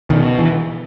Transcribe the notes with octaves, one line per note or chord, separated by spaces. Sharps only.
B2 D#3
E3